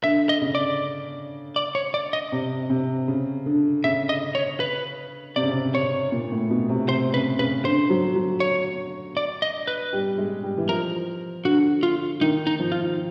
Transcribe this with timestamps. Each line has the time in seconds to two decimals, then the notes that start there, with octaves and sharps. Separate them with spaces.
0.04 D3 E5
0.29 D#5
0.42 C#3
0.55 D5
1.56 D5
1.75 C#5
1.94 D5
2.13 D#5
2.32 C3
2.70 C3
3.08 C#3
3.46 D3
3.84 C#3 E5
4.09 D#5
4.35 C#5
4.60 B4
5.36 C3 D5
5.43 C#3
5.51 C3
5.74 C3 C#5
6.12 A#2
6.32 A2
6.50 B2
6.69 C3
6.88 C3 C5
7.14 C#3 B4
7.39 C#3 B4
7.65 D3 C5
7.90 F#3
8.15 F#3
8.40 C#5
9.17 D5
9.42 D#5
9.67 B4
9.93 G3
10.18 G#3
10.43 G3
10.58 E3
10.69 F3 A#4
11.45 D3 F#4
11.83 F4
12.21 D#3 D#4
12.47 D#4
12.59 F3
12.72 F4